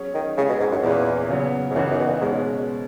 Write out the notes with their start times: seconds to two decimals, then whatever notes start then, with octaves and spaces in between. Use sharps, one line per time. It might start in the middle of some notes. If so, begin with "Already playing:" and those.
Already playing: F#3 C#4 G#4 C#5
0.14 D#3
0.37 C#3 G#3 C#4 E4 G#4 C#5
0.49 B2
0.60 G#2
0.71 F#2
0.83 E2 A#2 A#3 C#4 E4 B4
1.29 C#3 F#3 B3
1.71 G#2
1.75 F#2 C#3 E3 B3 D#4 F#4
1.91 F#2
1.99 B2
2.06 A#2
2.21 G#2 B2 G#3 C#4